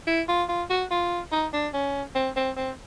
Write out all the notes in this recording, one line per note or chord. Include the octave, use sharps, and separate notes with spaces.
E4
F4
F4
F#4
F4
D#4
D4
C#4
C4
C4
C4